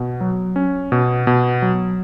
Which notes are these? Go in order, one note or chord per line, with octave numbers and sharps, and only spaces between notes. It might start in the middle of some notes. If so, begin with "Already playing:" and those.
Already playing: B2
F#3
C#4
B2
B2
F#3